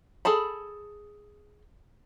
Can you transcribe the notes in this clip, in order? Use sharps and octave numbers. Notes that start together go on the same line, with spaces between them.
G#4 A4 A5 B5